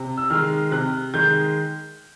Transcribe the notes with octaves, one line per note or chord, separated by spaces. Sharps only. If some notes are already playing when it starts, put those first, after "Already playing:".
Already playing: C3
E6
D#3 G#3 F6
C3 F#6
D#3 G#3 G6